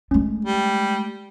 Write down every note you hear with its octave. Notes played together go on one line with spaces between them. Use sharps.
G#3 A3 C#4
G3